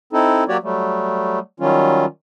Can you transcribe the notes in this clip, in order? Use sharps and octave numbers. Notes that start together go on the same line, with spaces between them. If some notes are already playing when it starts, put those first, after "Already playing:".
C4 D#4 E4 A4
F#3 A#3 F#4 G4 C#5 D5
F#3 G3 A3
D#3 F#3 G3 C#4 F4